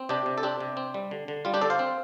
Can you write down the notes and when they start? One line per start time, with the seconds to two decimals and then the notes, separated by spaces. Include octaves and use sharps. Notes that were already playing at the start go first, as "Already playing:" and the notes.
Already playing: C4
0.09 C3 D4 G4
0.26 C3
0.38 A4
0.43 C4 D4 G4
0.60 C3
0.77 C4
0.94 G3
1.11 D3
1.28 D3
1.45 G3 F4
1.54 D4 G4
1.61 D3 A4 D5
1.70 C5 F5
1.79 C4